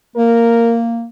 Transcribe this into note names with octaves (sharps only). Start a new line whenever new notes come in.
A#3 A#4